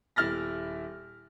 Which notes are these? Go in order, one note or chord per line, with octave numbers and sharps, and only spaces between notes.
D#1 E4 E5 F6 A6 A#6